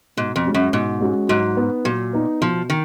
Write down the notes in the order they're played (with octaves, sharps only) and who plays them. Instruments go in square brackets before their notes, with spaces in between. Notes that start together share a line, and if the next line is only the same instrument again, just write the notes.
[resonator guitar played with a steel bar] G#2 [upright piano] B2
[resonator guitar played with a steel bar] F2
[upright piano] G#3 C#4 F#4
[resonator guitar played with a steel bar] F#2
[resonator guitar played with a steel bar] G#2 [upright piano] B2
[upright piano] G#3 C#4 F#4
[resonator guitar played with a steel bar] G#2 [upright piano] F#3
[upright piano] B3 D#4
[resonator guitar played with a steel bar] A#2 [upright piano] F#3
[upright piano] B3 D#4
[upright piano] B2 [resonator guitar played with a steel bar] F3
[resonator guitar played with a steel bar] D#3